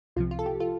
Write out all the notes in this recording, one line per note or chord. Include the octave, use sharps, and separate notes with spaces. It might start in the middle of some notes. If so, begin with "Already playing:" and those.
C2 C3 F3 F4
F4
A4
G4
F4 A4